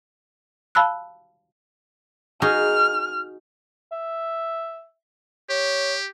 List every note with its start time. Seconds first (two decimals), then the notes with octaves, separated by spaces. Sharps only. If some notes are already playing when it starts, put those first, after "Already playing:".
0.75 F5 A5 B5 E6 F#6
2.42 D#4 F#4 G#4 F6
3.92 E5
5.50 G4 C#5